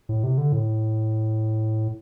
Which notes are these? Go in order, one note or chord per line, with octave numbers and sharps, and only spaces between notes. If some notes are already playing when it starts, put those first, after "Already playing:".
A2
C3
D3
A2